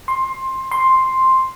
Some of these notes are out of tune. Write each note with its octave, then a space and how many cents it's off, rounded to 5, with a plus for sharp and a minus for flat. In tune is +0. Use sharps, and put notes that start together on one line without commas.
C6 +15
C6 +5